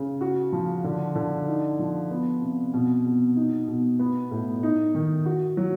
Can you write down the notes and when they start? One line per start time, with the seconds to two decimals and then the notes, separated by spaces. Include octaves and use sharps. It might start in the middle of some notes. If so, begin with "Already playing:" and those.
Already playing: C#3
0.21 F#4
0.52 F3
0.84 D3
1.15 D3
1.47 D#4
1.79 F3
2.11 B3
2.42 C3
2.74 B2
3.05 B2
3.36 D#4
3.68 B2
3.99 B3
4.31 A2
4.63 D#4
4.94 D#3
5.25 F#4
5.57 F#3